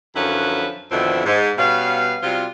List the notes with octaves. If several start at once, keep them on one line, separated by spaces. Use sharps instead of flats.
F#2 D3 F3 C#4 E4 B4
F2 B2 D3 D#3 C4 E4
G#2
B2 G3 B3 C#4 F5
C3 F#3 G3 F4